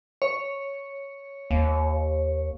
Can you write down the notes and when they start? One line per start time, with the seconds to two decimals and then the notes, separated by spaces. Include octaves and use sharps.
0.22 C#5
1.51 D#2